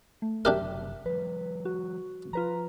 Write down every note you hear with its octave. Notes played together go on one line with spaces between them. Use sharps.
A3
F#1 C3 F#3 D4 G4 A#4 E5
F3 G3 B4
F#4
F3 F4 B4 A#5